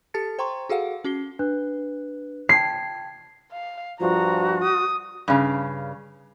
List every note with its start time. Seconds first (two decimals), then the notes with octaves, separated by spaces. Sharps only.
0.14 G4 A4 A5 A6 C#7
0.39 C5 G5 A#5 C6 C#6
0.69 F#4 G#4 A4 F5 F#5
1.04 C#4 F#4 C7 G7
1.39 D4 B4 F#6
2.49 G5 A5 G#6 C7
3.52 F5
4.00 G2 F3 F#4 A#5
4.63 D#6
5.28 G2 C#3